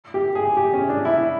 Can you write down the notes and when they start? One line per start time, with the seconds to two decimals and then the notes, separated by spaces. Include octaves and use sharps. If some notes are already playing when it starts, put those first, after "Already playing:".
0.14 G4
0.35 G#4
0.57 G4
0.74 C#4
0.89 D4
1.05 E4